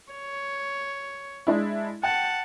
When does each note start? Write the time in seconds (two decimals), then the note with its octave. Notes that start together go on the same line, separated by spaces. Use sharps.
0.13 C#5
1.47 G#3 D4 E4
2.03 F#5 G5 A5